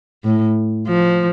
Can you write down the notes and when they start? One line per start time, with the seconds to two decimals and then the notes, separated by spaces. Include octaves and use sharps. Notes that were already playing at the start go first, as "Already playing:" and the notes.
0.24 A2
0.88 F3